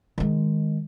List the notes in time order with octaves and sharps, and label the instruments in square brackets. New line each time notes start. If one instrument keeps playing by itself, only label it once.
[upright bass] D#3 G#3